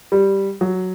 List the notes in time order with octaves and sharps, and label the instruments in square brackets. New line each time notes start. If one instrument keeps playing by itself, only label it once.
[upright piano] G3
F#3